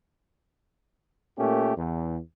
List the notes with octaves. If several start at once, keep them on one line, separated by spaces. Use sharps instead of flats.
A#2 A3 A#3 C#4 G4
E2